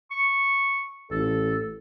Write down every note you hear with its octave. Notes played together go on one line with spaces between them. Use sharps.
C#6
A1 A4